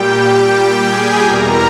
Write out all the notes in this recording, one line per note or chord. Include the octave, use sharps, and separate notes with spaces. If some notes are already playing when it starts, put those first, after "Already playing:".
Already playing: A#2 G3 G4 G5
G#4 G#5
E2 B2 G3 A#4 A#5